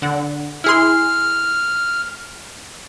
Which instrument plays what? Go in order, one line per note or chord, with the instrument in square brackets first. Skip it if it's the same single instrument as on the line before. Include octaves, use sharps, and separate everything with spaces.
[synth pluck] D3 F#5
[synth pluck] E4 G#4 C6 [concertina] F6